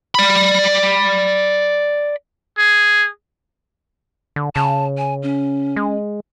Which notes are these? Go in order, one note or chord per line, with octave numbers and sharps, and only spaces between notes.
D5 B5
G#4
D3
C#3 A5
G#5
C#4
G#3